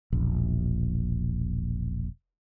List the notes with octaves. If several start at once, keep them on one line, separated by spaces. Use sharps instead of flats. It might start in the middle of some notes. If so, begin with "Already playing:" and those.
E1 A#1